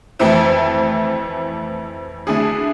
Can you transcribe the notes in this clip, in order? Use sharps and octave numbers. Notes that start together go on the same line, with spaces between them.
F2 E3 A3 C4 E4
D3 A3 E4 G#4